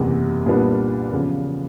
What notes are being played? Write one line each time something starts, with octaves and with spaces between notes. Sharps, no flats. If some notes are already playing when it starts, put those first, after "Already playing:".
Already playing: F#1 E2 C3 E3
C2 A#2 G3 B3 D4
E2 C#3 F3